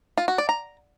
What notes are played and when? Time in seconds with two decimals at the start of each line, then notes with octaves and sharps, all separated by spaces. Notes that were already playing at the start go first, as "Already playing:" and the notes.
0.18 F4
0.28 F#4
0.38 D5
0.49 A#5